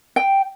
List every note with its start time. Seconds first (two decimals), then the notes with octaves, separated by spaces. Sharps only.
0.16 G5